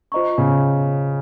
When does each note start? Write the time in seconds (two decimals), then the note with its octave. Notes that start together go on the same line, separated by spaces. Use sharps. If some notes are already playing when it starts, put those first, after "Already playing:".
0.12 F4 C5 D#5 A#5 C#6
0.38 C#3